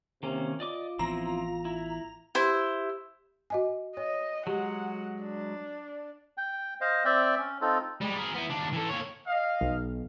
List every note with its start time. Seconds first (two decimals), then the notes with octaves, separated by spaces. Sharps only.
0.23 C3 D#3 A#3 C#4
0.60 F4 D5 D#5 D6
0.99 A1 E3 F3 B3 C4 E4 A#5
1.65 E4
2.35 E4 G4 C5 E6
3.50 F#4 D#5 G#5
3.97 C#5 D#5
4.47 F#3 G#3 G4 F#5
5.23 D4
6.37 G5
6.81 C5 D#5 F5
7.05 C4 D5 E5 G5
7.38 C#4
7.61 C4 D#4 F4 A4
8.02 G3 G#3
8.17 G#4 A#4
8.35 B3 E4
8.50 D#2 D4
8.73 E3 A4
8.90 A#3 C#5
9.27 D#5 F5
9.61 B1